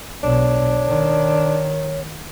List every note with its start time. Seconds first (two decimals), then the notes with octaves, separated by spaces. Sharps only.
0.24 B1 B2 D4 C#5
0.88 D#3